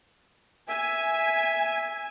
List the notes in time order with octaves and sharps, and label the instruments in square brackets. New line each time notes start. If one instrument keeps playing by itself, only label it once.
[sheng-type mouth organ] E5 [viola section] G#5